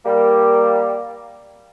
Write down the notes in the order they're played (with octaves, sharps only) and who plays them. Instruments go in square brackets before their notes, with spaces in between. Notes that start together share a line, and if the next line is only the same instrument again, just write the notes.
[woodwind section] G3 A#3